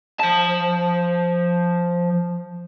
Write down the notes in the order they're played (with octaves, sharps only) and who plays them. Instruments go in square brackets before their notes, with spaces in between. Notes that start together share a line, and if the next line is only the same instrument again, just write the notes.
[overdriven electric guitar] F3 A5